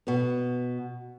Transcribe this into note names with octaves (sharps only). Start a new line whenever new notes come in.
B2 B3